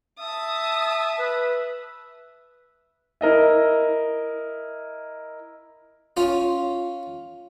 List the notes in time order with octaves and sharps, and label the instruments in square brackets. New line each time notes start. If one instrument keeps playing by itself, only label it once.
[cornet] E5 [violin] A5 D#6
[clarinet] B4
[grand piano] E4 A#4 D#5 E5
[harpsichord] C#4 F4